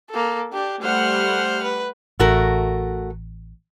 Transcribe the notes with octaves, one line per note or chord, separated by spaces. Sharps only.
A#3 A4
D4 G4
G3 A3 C5 F#5 F6
B4
A1 A3 F#4 A#4